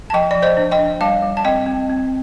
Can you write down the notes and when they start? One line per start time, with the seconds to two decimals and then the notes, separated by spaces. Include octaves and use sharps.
0.10 A5
0.14 F3 D#5 G5
0.31 F3 D5
0.42 C5 D#5
0.57 D4
0.71 D#5 G5
0.79 D4
1.01 G3 F5 A5
1.23 G3
1.37 A5
1.45 C4 D#5 G5
1.66 C4
1.90 C4